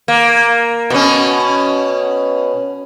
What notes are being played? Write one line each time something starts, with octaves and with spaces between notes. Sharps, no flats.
A#3
B2 C#4